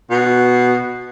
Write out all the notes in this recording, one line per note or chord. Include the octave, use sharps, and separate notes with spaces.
B2